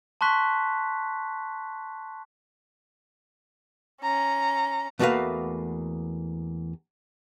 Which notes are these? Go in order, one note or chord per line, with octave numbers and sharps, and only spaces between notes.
A5 C6 C#6 F#6 B6
C#4 A#5
E2 A3 A#3 F#4 B4 F5